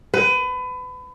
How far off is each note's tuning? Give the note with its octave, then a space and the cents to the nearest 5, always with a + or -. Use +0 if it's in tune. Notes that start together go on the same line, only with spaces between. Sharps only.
B4 +30